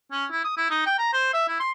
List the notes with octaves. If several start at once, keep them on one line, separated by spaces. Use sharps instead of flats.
C#4
E4
D#6
E4
D#4
G5
A#5
C5
E5
E4
C6